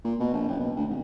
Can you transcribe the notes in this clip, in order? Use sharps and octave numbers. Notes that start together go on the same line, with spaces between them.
A#2
B2
A#1
F#1
B2
D2
G#1